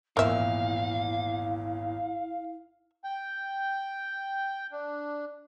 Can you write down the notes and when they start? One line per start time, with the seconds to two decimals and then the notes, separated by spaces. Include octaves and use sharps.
0.17 G#1 E2 A#2 E4 A#4 E5 F5
3.04 G5
4.72 D4